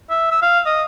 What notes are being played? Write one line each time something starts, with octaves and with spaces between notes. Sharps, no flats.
E5
E6
F5
D#5